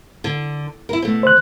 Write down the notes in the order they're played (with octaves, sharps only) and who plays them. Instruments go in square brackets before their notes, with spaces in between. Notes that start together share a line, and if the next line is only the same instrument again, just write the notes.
[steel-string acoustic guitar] D3
E4 A#4
B2 A3
[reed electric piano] C5 F#6